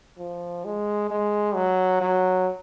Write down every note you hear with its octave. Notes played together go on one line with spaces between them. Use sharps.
F3
G#3
G#3
F#3
F#3